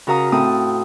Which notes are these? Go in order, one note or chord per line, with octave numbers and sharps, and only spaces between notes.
C#3 F#4 A#4 F5 A#5 D#6
A2 C4 A4 D#6